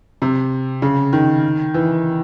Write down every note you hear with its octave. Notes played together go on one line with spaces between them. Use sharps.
C3
C#3
D#3
E3